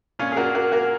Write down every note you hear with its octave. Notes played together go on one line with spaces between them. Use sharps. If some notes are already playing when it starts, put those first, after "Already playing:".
A#2 C#4 F4
G#4
A#2 F#4 A#4
A#3 F#4 A#4
A#3 F#4 A#4